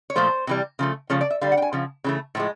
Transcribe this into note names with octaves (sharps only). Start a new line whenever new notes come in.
C#5
A#2 F3 A3 C5
C3 E3 G3
C#3 F3 A3
C#3 F3 A3 C#5
D5
E5
D3 G3 F5
F#5
G5
G#5
C#3 F3
C#3 E3 A3
A2 F3 G#3